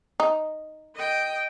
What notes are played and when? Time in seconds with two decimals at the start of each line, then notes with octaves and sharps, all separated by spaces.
0.20 D#4
0.96 D#5 G5